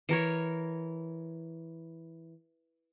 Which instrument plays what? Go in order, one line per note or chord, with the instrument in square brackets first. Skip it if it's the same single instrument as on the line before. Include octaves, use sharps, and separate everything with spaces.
[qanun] E3 A#4 C#5